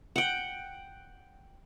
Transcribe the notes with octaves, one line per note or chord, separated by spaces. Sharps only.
F#5 G5